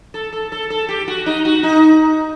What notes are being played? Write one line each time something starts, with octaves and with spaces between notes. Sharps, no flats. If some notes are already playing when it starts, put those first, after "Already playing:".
A4
A4
A4
A4
G4
F#4
D#4
F#4
D#4